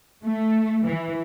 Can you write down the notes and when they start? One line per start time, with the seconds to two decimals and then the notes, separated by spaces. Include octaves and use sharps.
0.25 A3
0.88 E3